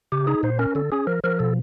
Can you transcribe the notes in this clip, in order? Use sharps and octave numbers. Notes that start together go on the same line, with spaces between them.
C#3 G4
D#4 G#4
A#2 C5
C#4 A#4
D3 A4
C#4 G#4
F3 A#4
F3 A#4
B2 A4